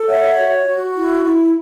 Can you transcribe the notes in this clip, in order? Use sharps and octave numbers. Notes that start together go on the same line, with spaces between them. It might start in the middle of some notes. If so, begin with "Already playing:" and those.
Already playing: A4
C#5 E5 F#5
F#4
F#4
E4
E4